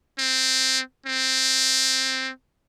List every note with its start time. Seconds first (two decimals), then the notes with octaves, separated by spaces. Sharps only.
0.19 C4
1.07 C4